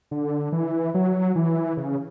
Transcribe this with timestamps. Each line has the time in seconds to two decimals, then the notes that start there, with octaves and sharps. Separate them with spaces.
0.11 D3
0.52 E3
0.94 F#3
1.36 E3
1.77 C#3